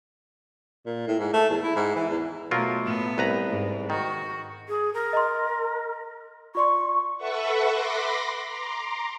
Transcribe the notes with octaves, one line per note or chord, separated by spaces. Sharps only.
A#2
A2
G#2
A3
E2
E4
G#2
E3
E2
B2 F#3 A3 F4 A#4
A2 B3
C2 B4 A#5
G#2
D#3 F#4
G#4
A#4
D#5 A#5 C6
F4 D5 C6 C#6
A4 B4 E5 F#5 C#6
B5 C6 D6 A#6
A#5 C6 D6